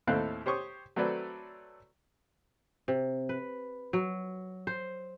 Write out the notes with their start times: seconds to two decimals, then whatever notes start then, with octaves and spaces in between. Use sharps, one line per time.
0.07 D#2 A2 C4 A4 F5 F#6
0.46 G4 C5 C#5 C#6 D#6
0.96 F#3 A3 C4 A4 B4 D5
2.88 C3
3.29 B4
3.93 F#3
4.67 C5